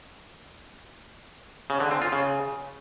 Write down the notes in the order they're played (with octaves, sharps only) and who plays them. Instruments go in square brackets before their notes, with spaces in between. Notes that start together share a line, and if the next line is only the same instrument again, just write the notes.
[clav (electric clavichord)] C#3
D3
C4
F4
C#3